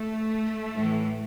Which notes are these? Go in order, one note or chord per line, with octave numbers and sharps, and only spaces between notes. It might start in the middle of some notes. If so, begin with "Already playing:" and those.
Already playing: A3
A2 E3